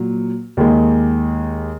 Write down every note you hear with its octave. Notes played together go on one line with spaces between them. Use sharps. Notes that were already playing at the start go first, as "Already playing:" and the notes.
Already playing: A#2 F#3
D#2 D#3 G#3